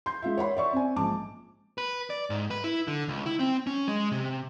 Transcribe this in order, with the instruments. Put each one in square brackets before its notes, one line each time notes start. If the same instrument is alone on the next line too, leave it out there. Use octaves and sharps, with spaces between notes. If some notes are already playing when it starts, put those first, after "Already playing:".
[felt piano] C6 G6
G#3 F4 E5
C#5 F#5 B5 C6
D5 E5 C#6
C4 G#5
A#1 G#2 G#3 A5 D6
[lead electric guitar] B4
D5
G#2
B4
E4
D3
C#2
E4
C4
C#4
G#3
C3